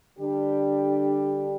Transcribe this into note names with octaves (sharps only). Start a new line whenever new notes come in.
D3 G3 D4 G4